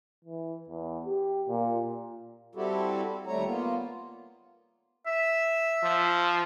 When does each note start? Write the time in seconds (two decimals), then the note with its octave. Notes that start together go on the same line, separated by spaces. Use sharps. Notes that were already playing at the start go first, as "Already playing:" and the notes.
0.25 E3
0.69 E2
1.06 G4
1.49 A#2
2.55 G3 C4 E4 F#4 G4 A4
3.27 D#2 G3 A3 C#5 A#5
3.45 A#3 B3 F4
5.06 E5
5.83 F3